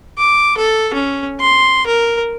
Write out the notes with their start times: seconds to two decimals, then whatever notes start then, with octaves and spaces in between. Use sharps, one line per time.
0.18 D6
0.58 A4
0.94 C#4
1.40 C6
1.86 A#4